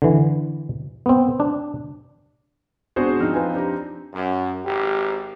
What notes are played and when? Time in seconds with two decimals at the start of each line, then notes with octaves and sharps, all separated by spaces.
0.02 D3 E3
1.06 B3 C4
1.40 D4
2.96 G#1 B3 D4 F#4 G#4 C5
3.20 F3 C4 D#4 F6
3.34 F4 B4 G#5
3.54 D4 G4 A#5
4.14 F#2
4.65 G#1 G4